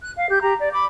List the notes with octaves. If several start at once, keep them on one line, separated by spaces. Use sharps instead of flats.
F#6
F5
G4 G6
G4 A#5
D5
B5 D6